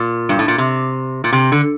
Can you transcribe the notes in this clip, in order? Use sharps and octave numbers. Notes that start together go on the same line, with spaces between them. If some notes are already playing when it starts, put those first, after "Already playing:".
Already playing: A#2
G2
A2
A#2
C3
A#2
C3
D3